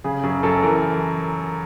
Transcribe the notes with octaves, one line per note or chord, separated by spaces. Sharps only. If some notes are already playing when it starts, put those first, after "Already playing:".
C#3 G#4
F#2 G#4
F#2 A4
E3 A#4